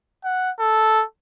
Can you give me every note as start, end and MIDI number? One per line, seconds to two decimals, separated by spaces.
0.24 0.51 78
0.59 1.04 69